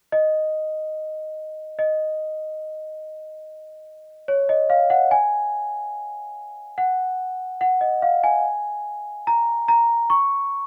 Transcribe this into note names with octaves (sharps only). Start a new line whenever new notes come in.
D#5
D#5
C#5
D#5
F5
F#5
G#5
F#5
F#5
D#5
F5
G#5
A#5
A#5
C#6